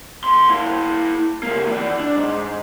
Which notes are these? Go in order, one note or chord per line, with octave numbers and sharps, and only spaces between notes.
D2 C6
A#3 E4
C#2 A#3
E3 D5
D4
G#2